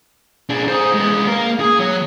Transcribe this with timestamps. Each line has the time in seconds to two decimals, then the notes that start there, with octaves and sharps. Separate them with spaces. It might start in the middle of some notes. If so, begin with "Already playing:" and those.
0.50 D4 G#4
0.68 G#4 C5
0.95 G#3 B3
1.27 A#3 A#4
1.60 G#4
1.79 F#3